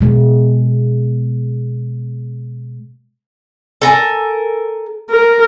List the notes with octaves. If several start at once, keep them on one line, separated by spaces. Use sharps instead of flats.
B2 G#3
A4 A#4 G#5
A#4